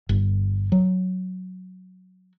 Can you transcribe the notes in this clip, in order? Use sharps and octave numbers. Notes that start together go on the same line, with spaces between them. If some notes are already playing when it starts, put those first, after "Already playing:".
G1
F#3